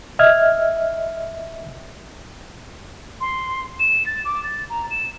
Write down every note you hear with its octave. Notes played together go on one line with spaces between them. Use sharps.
D#5 E5 F6 G#6
C6
E7
A6
D6
A6
A#5
E7